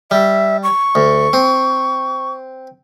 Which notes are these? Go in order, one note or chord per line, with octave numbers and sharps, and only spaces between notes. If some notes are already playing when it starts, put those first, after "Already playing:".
G3 E5
C#6
D2
C4